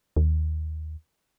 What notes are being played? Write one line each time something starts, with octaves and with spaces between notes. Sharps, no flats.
D#2